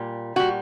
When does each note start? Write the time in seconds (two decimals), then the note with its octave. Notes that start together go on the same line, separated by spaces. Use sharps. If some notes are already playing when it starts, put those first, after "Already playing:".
Already playing: A#2 G3
0.36 A#2 G3 F#4